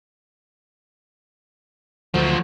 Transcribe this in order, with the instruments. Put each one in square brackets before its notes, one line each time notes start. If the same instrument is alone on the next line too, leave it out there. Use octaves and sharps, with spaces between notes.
[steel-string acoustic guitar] D2 [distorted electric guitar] F3 F#3